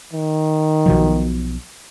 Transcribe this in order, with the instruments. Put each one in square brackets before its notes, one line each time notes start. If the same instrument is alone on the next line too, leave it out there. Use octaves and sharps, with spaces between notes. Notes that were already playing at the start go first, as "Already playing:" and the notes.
[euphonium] D#3
[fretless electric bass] B1 B2 F3